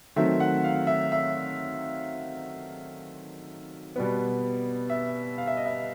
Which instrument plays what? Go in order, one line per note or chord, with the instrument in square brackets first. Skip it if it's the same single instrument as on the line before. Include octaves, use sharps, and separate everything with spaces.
[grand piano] D#3 F#3 A3 C4 E5
F#5
F5
E5
E5
B2 G3 B3
E5
F5
E5
D#5
E5